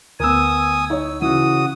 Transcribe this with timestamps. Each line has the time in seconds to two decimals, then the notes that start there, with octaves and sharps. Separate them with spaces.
0.20 D2 B3 A#4 G#5 D#6 E6
0.90 D#4 C#5
1.22 C#3 E3 F#4 D#6